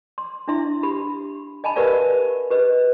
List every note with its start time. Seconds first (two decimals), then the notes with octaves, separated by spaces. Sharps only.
0.18 C6
0.48 D4 E4 E5 C6
0.83 G4 B5
1.64 D#5 G#5 A5 B5
1.76 G4 A#4 B4 D5 F5 A5
2.50 G4 B4 D#5